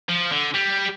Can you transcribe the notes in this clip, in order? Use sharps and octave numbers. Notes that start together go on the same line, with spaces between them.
F3
D3
G3